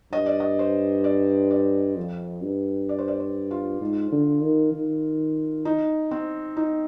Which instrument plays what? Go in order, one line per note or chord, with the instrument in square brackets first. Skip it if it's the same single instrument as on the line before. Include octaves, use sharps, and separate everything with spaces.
[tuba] G2 [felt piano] D#5
[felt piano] D5
D#5
C5
D5
D5
[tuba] F2
G2
[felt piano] D5
C5
D5
C5
F4
[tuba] G#2
D3
D#3
D#3
[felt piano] D#4
C4
D#4